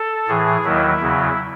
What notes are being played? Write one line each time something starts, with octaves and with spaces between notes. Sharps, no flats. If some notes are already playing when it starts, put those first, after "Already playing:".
Already playing: A4
A2 E3 G#4
D#2 D#3 F#3 E4
E2 C#3 F#3